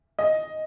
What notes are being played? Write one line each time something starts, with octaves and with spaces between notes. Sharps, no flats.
D#5